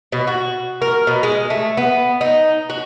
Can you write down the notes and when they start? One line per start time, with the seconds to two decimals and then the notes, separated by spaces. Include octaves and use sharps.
0.12 B2
0.27 F#4
0.82 A#4
1.07 B2
1.23 G#3
1.50 A3
1.77 B3
2.21 D#4
2.70 F#4